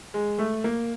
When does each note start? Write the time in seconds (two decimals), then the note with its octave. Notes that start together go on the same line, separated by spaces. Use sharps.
0.14 G#3
0.38 A3
0.64 A#3